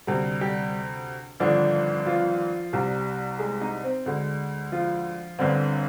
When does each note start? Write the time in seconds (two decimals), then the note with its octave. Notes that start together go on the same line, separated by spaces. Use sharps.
0.07 D2 C3 G3
0.41 G3 G4
1.40 G#1 G2 D3 F3 D4
2.06 F3 F4
2.73 C2 C3 G3 G4
3.39 G#3 G#4
3.61 D#4 D#5
3.84 C4 C5
4.06 D2 D3 G#3
4.72 F3 F4
5.39 G1 G2 D3 C4